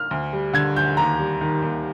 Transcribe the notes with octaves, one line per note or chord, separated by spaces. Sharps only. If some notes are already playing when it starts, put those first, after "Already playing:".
Already playing: F6
D2
G3
D3 G#6
D2 G6
D#2 A#5
G3
D#3
D#2